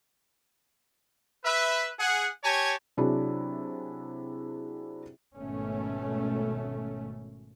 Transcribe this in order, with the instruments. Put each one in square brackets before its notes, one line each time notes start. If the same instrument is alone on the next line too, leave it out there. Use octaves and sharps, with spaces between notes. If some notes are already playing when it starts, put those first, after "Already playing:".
[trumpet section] B4 E5
G#4 F#5
G4 C#5 G#5 A5
[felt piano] C3 F#3 D4 E4 F#4 G#4
[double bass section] G#1 B2 A3 C#4